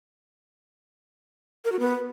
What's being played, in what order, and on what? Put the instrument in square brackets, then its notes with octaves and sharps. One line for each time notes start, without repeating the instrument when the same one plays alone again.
[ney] A#4
F#4
B3